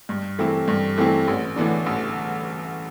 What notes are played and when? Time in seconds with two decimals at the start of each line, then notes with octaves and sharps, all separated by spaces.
0.09 G2
0.39 E3 A3 C4 E4
0.68 G2
0.98 E3 A3 C4 E4
1.28 A1
1.56 A2 E3 B3 D4
1.86 A1